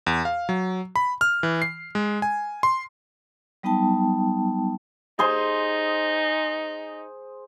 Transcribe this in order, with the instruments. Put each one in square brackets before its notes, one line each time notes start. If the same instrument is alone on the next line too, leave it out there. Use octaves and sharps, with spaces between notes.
[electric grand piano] E2
F5
F#3
B5
F6
E3
C7
G#3
G#5
C6
[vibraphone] F#3 G3 B3 D#4 G5 A5
[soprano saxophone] D#4 [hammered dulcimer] G#4 C5 C6